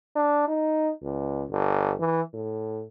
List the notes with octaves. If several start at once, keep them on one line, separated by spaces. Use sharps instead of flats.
D4
D#4
C#2
G1
E3
A2